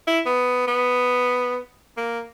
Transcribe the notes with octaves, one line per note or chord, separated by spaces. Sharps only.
E4
B3
B3
A#3